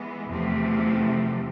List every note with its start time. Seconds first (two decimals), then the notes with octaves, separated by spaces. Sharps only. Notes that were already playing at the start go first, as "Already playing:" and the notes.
Already playing: E3 G#3 B3
0.29 E2 C3 F3 A3